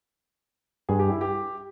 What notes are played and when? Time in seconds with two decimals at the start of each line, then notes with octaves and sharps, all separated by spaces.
0.89 G2 G#4
0.99 G4
1.10 E4
1.21 G4